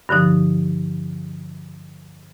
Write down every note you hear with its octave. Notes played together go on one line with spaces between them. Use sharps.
G2 D3 F3 D#4